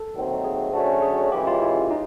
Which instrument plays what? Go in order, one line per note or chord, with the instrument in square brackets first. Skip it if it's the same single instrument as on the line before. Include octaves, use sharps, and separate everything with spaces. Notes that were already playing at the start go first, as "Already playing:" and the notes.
Already playing: [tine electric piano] A4
[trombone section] D#2 D#3 F#3 A3 C4
[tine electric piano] G#4
[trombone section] D3 F#3 A3 C#4 F#4
[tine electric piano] G#4
[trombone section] F#2 C#3 E3 G#3 [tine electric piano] G4
[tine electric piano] F4
E4
D#4